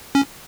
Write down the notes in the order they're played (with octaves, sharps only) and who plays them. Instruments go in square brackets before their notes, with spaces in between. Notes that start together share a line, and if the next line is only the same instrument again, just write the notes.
[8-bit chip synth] C#4